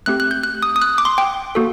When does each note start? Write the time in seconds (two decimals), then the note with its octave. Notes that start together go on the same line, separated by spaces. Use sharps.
0.06 A3 C4 G4 F#6
0.20 F#6
0.31 G6
0.43 F#6
0.63 D#6
0.76 D#6
0.82 F#6
0.98 D6
1.05 C6
1.18 G5
1.55 A#3 F#4 A4